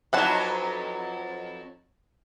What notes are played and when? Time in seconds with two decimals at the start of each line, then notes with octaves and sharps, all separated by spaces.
0.13 F2 E3 F#3 D#4 F#5 A5